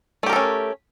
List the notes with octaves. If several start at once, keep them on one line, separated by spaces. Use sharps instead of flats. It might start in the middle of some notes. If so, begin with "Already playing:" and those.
A3 C#4 G4 A4 A#4